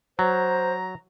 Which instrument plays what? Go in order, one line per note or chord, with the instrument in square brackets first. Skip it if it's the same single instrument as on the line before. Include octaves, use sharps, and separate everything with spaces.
[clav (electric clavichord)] F#3 [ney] C5 [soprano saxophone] A#5